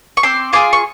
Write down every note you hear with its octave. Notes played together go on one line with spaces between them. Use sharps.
C#6
C4 C6 D6
F4 G#4 C6 D6
C#6